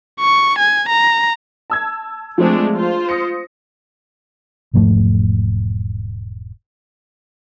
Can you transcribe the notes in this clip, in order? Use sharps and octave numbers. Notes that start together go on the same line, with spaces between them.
C#6
G#5
A#5
A5 E6 G#6
F3 G#3 A3 C4 D4
F4 C5
D#6 A#6 C#7
E1 G#2 F3 A3